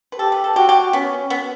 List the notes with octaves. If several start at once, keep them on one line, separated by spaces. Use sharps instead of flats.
B4
G4 A4
B4
A4
F#4 G4
G4
B3 C#4
B3